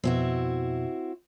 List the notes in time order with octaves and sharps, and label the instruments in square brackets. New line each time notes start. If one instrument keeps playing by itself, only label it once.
[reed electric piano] F2 B2 [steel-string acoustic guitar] C4 E4 F#4